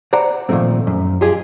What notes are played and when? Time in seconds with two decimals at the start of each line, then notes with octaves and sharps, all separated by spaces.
0.13 C5 D5 F#5 A#5
0.49 A#2 D#3 F3 A3 C4
0.87 F#2
1.21 F4 G4 G#4 D#5